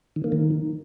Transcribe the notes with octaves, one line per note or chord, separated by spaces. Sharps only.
D#3
A#3
D#3